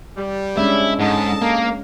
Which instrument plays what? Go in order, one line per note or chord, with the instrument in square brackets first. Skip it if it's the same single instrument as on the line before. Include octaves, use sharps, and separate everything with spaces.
[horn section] G3
[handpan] G#3 C#4 D4 [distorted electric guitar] E4
[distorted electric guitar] G#2 [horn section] A4 D#5 A5
[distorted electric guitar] A#3